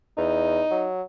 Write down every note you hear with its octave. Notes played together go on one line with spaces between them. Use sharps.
E2 D#4
F#3